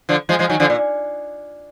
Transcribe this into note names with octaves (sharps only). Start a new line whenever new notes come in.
D3 F3
F3 G#3
F3 G#3
D#3 F#3
D3 F3
A#2